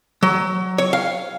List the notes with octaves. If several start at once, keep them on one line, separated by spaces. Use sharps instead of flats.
F#3
C#5
F5